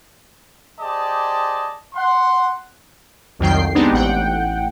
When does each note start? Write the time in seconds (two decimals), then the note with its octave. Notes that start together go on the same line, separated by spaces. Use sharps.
0.81 G4 G#4 C5 D5 D#5 A5
1.95 F#5 C6
3.39 C2 F2 D#3 F#3 G5 C7
3.75 G#3 B3 C4 D4 D#4 G4
3.92 A1 F#5 G5